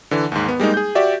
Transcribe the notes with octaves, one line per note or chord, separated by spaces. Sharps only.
D3 E3
D#2 G#2
B3
G3 G#3 A#3 D#4
G#4 G6
F#4 G4 D5 E5